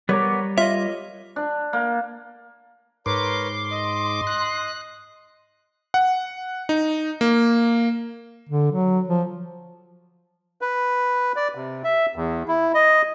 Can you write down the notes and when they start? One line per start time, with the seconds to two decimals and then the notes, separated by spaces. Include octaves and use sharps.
0.09 G3 B3 A#4 C#5 D6
0.58 F4 C#5 D#5 E5
1.36 D4
1.73 A#3
3.06 G#2 A#4 B4 C#5 C6 D6
3.71 D#5
4.27 F#6
5.94 F#5
6.69 D#4
7.21 A#3
8.49 D3
8.72 F#3
9.08 F3
10.61 B4
11.36 D5
11.55 C3
11.84 E5
12.16 E2
12.48 E4
12.74 D#5